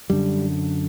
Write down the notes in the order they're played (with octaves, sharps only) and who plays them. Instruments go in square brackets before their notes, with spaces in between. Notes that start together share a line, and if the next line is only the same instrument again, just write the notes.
[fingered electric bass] F#2 D3 G3